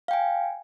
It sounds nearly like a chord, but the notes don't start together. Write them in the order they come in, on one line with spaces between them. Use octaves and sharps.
F5 G5 G#5